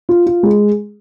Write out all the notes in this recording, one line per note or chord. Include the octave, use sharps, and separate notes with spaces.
F4
F4
G#3